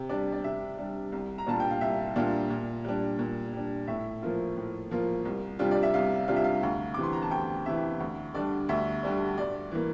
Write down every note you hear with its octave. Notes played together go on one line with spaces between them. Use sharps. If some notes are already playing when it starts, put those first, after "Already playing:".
Already playing: C3
G3 D4 D5
D5
C3 E5
G3 D4
C2
A#5
A#2 G3 D4 F4 A5
G5
F5
C2 E5
A#2 G3 D4 F4
A#2
G3 D4
A#2
G3 D4
A2 E5
F3 A#3 F4
A2
F3 A#3 F4
C2
C3 G3 D4 F4
D5
E5
C2 F5
C3 G3 D4 F4 F5
E5
F5
D2
C3 E3 D6
C6
A#5
A5
D2 G5
C3 E3 E5
D2
D3 G3 D4 D5
D2 E5
D3 G3 D4
G2 D5
E3 A#3